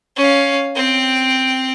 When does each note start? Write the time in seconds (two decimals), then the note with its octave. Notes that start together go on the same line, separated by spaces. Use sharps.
0.16 C#4 F5
0.75 C4 G5